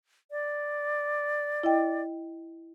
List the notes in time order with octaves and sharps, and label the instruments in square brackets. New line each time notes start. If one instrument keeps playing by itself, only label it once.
[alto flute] D5
[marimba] E4 D#5 G5